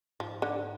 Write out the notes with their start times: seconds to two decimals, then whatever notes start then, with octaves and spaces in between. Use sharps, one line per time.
0.20 G#2 F3
0.42 D3